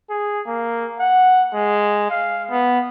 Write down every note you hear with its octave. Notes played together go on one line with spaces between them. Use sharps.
G#4
A#3
F#5
G#3
F5
B3